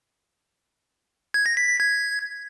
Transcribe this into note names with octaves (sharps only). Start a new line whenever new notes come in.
G#6
A#6
B6
B6
G#6